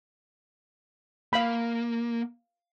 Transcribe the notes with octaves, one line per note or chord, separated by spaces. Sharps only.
A#3 F5 B5